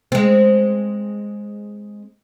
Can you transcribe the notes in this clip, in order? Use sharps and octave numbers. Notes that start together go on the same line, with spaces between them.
G#3 C4